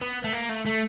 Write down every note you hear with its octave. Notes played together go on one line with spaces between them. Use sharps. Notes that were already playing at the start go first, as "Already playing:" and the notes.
B3
A3
A#3
A3
A3